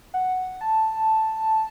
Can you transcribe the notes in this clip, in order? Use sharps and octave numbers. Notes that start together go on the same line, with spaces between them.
F#5
A5